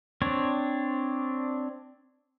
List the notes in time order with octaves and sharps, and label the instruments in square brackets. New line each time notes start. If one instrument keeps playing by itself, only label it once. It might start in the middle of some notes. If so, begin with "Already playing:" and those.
[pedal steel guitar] C4 D4 C#5